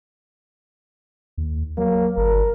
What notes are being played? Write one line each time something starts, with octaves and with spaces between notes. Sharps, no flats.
D#2
F#3 A#3
G1 A#4